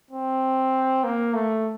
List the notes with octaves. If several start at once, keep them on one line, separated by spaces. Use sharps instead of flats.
C4
A#3
A3